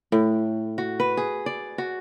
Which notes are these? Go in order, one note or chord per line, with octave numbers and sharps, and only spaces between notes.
A2
F#4
B4
G#4
D5
F#4